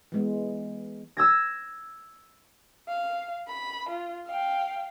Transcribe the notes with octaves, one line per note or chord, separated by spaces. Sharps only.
E3 G#3 B3
E6 G#6 A#6
F5
B5
F4
F5 G5